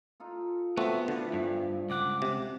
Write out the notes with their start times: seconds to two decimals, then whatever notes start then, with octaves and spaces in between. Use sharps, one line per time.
0.20 D#4 F4 A4
0.77 D3 A3 B3 C4 F#4 E5
1.08 A2 D3 F3 G3
1.33 G2 D#5 G#5
1.90 C#2 F#5 D6
2.22 C3